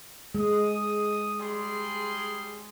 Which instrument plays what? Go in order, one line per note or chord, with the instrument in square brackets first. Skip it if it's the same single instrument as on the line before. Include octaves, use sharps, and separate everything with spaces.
[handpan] G#3 [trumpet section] D#6
[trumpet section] G3 G#4 C6